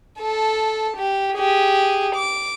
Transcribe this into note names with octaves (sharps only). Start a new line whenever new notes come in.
A4 A5
G4
G4 G#4
D6